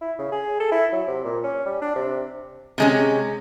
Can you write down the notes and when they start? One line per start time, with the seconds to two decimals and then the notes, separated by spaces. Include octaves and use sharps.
0.01 E4
0.18 C#3
0.32 G#4
0.60 A4
0.71 E4
0.92 F#3
1.07 C3
1.24 A#2
1.43 C#4
1.65 G3
1.81 D4
1.95 C3
2.78 C3 G#3 C#4